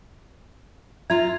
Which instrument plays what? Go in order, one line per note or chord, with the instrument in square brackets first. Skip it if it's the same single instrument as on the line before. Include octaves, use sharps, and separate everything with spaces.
[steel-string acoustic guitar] F4 A#5 [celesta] E5 G#6